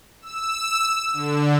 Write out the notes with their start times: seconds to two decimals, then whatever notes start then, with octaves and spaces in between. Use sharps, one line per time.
0.22 E6
1.13 D3